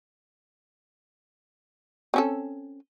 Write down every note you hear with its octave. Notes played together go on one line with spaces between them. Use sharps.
C4 C#4 A4